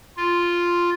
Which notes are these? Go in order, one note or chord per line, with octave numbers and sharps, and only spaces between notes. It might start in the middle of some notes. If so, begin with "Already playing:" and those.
F4